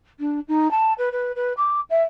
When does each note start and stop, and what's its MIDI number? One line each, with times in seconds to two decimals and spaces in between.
0.19 0.40 62
0.48 0.70 63
0.71 0.93 81
0.98 1.09 71
1.12 1.31 71
1.35 1.53 71
1.57 1.80 86
1.90 2.02 76